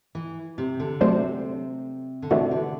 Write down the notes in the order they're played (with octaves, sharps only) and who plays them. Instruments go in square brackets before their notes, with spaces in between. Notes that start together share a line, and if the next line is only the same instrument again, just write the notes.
[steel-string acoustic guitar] E3
C3
D3
[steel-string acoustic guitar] C3 [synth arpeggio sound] F#3 A3 D4 F#4 C5
[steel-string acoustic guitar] D3
[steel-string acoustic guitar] C3 [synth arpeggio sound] E3 A3 D4 F#4
[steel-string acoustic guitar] D3